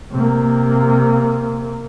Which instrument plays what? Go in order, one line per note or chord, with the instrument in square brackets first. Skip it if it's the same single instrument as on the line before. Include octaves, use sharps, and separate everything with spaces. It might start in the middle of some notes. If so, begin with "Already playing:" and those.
[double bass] C3 A#3